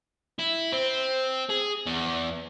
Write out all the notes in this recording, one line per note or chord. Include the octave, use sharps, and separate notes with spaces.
E4
C4
G#4
E2